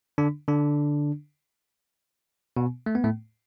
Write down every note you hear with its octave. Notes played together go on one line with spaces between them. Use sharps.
D3 D4
D3 D4
B2 B3
A3
B3
A2 A3